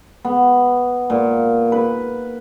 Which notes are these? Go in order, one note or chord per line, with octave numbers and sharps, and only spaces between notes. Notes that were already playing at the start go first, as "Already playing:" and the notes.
B3
A#2
B4